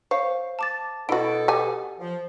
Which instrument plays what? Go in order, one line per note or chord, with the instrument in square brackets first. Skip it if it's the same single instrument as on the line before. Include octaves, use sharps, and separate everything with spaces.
[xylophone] C5 F5 [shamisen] C#5
[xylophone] A5 D6 A6
[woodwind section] B2 A4 [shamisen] E4 F#4 [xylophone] D7
[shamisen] G4 G#5
[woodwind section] F3